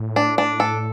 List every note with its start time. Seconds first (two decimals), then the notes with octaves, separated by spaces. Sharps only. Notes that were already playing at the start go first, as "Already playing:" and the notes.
Already playing: A2
0.16 D4
0.38 D4
0.60 A4